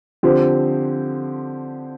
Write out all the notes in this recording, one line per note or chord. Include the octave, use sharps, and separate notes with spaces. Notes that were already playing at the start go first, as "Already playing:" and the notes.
D3 F3 C4 G4 C5